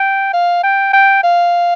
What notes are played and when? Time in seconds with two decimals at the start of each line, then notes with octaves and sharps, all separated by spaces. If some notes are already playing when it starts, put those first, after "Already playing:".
Already playing: G5
0.33 F5
0.64 G5
0.93 G5
1.23 F5